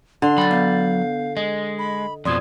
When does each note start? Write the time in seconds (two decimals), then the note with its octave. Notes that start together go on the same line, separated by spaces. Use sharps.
0.22 D3 C6
0.38 F#3 G5 B5 A6
0.50 B3 F5 G6
1.37 G#3 D#5
1.79 B5
2.25 F2 B2 F3 D5 C6 D#6 G#6